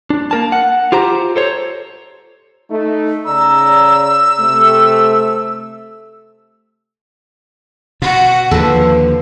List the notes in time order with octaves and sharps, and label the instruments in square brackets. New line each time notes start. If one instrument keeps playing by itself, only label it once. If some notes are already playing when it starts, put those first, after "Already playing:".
[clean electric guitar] D4
A#3 A#4 A5
F#5
F4 G4 C5 A#5
A4 C5 C#5
[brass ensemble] A3 D#4
[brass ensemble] C#3 D5 A#5 [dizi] E6
[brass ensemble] C3 A3
[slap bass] B2 [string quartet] F#4
[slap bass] D#2 D3 [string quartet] F3 [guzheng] A4 B4